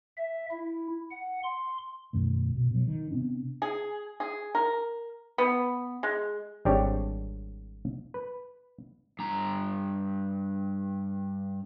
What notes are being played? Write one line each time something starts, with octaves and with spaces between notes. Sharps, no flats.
E5
E4
F#5
C6
B1 F#2 D#3 A3
B2
B2 F#3
D#3
C3 B3 C4 D4
G#4
G#4
A#4
B3
G#3
G#1 G3 C4 D4 G4 C#5
B4
G2 A#5